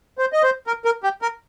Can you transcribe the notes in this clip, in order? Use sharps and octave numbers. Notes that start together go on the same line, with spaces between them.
C5
D#5
C5
A#4
A#4
G4
A#4